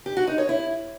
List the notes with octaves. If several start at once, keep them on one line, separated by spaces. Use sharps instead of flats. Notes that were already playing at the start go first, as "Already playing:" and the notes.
G4
F#4
D#4
C#5
E4